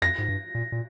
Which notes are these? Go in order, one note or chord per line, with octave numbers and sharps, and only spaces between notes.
F2 A#6
G#2
G2
A#2
A#2